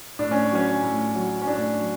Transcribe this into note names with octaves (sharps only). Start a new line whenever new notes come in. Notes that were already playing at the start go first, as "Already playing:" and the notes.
A2 D4
C#4
F#3 C#4
A2
F#3
C#4
A2 D4
F#3